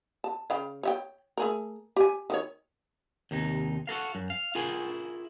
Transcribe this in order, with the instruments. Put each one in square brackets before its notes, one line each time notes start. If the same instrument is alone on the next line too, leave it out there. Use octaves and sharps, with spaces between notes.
[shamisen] A5
C#3 F5 G5
C#5 E5 G5
A3 G#4 A#4
G4 G#5
D#3 G4 C#5
[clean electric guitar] D#2 C3 D#4
F#4 A4 A#4 F5
F#2
F5
E4 F4 G#4 A#4 G#5